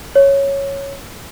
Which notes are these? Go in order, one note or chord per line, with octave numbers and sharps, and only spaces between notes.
C#5